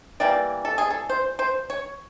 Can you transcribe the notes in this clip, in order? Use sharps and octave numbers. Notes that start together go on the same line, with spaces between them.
E3 G3 A#3 D5
A4
G#4
A4
C5
C5
C#5